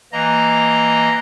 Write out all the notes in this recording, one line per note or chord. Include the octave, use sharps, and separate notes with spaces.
E3 A#3 D#5 A#5